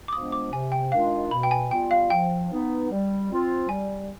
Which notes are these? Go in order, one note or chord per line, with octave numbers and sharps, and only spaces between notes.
D6
F3 G#3 B3 D4 D#6
D6
C3 G#5
G5
D#3 G#3 D4 F4 F5
B2 B5
G5
G#5
G3 B3 F4 G5
F5
F3 G5
B3 D#4
G3
C4 F4
G3 G#5